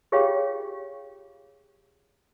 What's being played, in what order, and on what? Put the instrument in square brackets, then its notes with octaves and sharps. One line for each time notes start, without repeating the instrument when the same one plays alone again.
[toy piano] F4 G4 G#4 C#5 F5 G5